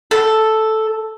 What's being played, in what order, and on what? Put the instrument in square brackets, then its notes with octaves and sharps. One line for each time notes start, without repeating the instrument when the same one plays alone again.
[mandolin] A4